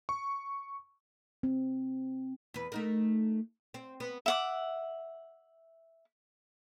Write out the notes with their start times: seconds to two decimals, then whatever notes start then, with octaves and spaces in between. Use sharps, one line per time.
0.09 C#6
1.43 C4
2.54 E2 B4
2.72 A3 D#4 A#4
3.74 C4
4.00 B3
4.26 E5 F#5 D6